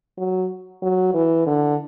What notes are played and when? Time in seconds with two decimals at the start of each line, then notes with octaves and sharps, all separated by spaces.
0.18 F#3
0.82 F#3
1.14 E3
1.47 D3